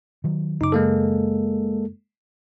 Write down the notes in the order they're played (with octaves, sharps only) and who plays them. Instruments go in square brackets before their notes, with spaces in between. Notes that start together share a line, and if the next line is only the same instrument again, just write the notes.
[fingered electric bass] D#3 F#3
[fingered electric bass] F#2 C#3 [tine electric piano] D#4 D6
[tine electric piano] G#3 A#3 A4